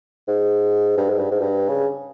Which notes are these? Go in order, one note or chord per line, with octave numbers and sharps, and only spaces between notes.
G#2
G2
G#2
G2
G#2
G2
C#3